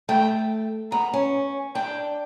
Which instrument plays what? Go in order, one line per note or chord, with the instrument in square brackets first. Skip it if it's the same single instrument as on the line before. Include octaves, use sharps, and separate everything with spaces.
[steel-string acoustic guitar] A3 [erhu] G5
[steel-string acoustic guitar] B3 [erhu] A#5
[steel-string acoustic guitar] C#4
[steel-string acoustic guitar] D4 [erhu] G5